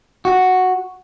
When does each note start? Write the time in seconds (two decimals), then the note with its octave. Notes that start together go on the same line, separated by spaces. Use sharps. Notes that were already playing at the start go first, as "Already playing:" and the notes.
0.25 F#4